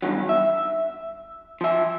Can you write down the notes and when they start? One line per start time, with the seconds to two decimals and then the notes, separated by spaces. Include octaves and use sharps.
0.02 E2 G2 C3 D#3 F#3
0.29 E5
1.61 F3 E5